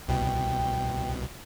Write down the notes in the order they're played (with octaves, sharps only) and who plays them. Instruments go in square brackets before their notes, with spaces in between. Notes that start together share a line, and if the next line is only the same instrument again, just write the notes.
[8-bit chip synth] C2 B2 [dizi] G5